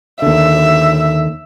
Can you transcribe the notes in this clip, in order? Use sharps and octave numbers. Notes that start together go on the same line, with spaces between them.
D#2 D3 E5